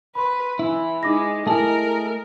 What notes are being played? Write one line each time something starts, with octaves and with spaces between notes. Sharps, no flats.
B4 B5 C6
E3 E4
G#3 D#4 D6 A#6
A3 E4 G#4 A#4 D#5 A5